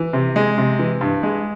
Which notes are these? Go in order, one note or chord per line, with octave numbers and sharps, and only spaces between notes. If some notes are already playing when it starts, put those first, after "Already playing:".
Already playing: E3
C3
G#3
C3
E3
G2
G#3